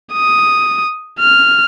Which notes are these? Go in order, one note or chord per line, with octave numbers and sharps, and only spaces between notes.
D#6
F6